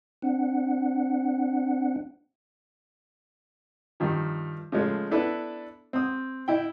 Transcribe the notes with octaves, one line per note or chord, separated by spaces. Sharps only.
C4 D4 F#5
G2 D#3 F3
C#3 F3 G#3 A3
B3 D4 E4 A4 B4
C4 D#6
D#4 E4 G5